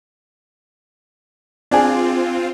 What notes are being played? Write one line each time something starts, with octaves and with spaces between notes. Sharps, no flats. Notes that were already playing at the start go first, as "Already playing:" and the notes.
C4 D4 F4 G#4